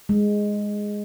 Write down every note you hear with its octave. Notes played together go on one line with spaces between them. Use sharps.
G#3